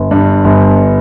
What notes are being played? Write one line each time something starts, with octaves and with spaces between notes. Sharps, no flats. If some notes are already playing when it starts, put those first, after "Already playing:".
Already playing: G1
G2
G1